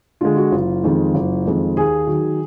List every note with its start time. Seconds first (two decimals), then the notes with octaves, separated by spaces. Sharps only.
0.21 D3 G#3 F4
0.37 F#4
0.52 F#1 F4
0.84 F2 D#3 G#3
1.14 F#1
1.45 F2 D#3 G#3
1.77 D#2 G#4
2.07 D#3 F#3